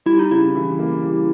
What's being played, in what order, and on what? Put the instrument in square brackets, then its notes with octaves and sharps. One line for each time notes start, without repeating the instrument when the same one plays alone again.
[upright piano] G3 [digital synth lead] E4
[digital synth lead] D#4
[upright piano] C#3 [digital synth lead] E4
[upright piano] E3
A#3
G3